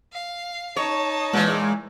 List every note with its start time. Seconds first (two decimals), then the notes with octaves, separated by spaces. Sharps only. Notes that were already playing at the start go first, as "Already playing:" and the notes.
0.13 F5
0.76 D#4 C#5 A5
1.33 A#2 E3 G#3